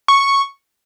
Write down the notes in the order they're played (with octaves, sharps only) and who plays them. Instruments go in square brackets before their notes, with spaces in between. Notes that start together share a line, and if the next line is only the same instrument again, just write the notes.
[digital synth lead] C#6